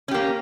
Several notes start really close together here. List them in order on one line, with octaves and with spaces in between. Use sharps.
C#4 G4 A#3